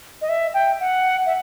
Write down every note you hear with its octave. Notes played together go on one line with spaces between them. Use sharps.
D#5
E5
G5
F#5
E5